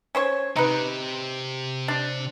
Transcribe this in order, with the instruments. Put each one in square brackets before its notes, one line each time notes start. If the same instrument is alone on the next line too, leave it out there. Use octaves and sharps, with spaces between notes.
[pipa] C#4 C5 C#5
[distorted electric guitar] C3 [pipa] D#4 B4
[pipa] D4